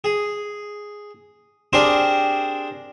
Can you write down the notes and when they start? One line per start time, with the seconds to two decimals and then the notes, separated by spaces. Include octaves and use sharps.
0.04 G#4
1.73 C4 D4 G4 G#4 A#4 C5